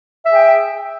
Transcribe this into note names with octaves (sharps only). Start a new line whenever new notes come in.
G#4 E5 G5